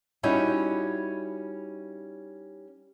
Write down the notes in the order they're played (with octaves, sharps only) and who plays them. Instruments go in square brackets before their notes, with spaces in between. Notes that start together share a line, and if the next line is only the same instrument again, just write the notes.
[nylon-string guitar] G3 C#4 D#4 E4 F#4